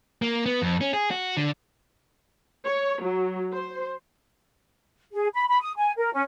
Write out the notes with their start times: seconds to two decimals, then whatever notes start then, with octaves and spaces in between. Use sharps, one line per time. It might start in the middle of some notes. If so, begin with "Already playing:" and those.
0.22 A#3
0.46 B3
0.62 F2
0.81 C#4
0.94 G#4
1.11 F#4
1.37 D3
2.65 C#5
3.02 F#3
3.52 C5
5.14 G#4
5.33 B5
5.48 B5
5.61 D#6
5.77 G#5
5.97 A#4
6.13 C#4